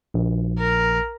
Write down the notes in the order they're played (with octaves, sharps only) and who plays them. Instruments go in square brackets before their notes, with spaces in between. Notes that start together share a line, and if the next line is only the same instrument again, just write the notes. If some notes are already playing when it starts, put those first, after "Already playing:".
[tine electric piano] A#1
[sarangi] A#4